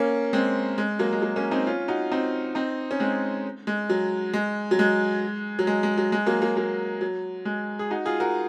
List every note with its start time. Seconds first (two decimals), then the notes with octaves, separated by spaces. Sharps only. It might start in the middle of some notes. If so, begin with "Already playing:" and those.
Already playing: A#3 C#4
0.33 G#3 C4
0.78 G#3
0.99 F#3 A#3
1.12 G#3
1.22 F#3 A#3
1.36 A#3 C#4
1.51 C4 D#4
1.67 C#4 F4
1.88 D#4 F#4
2.11 C4 D#4
2.55 C4 D#4
2.91 C#4
3.00 G#3 C4
3.67 G#3
3.90 F#3
4.33 G#3
4.71 F#3
4.79 G#3
5.59 F#3
5.67 G#3
5.83 G#3
5.97 F#3
6.12 G#3
6.26 F#3 A#3
6.42 F#3 A#3
6.57 F#3 A#3
7.01 F#3
7.45 G#3
7.79 G#4
7.90 D#4 F#4
8.06 F4 G#4
8.20 F#4 A#4